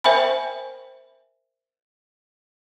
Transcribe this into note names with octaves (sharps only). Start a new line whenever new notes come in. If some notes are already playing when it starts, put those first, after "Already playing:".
A#4 C5 E5 G5 G#5 B5